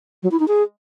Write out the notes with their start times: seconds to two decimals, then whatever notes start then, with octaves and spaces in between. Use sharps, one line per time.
0.23 F#3
0.31 E4
0.40 D#4
0.48 G#4